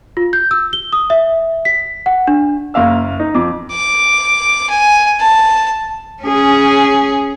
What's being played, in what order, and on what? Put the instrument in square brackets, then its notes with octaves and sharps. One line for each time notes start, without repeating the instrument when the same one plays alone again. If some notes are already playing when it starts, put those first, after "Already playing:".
[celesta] F4
G6
E6
G7
D#6
E5
B6
F#5
D4
[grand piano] F#1 A#3 F5 E6
D#4
F2 D6
[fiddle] D6
G#5
A5
[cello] C#4 G#4